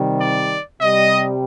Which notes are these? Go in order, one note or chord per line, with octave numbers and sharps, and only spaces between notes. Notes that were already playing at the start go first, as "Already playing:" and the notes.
Already playing: C3 D#3 G3
D5
C3 G3 D#5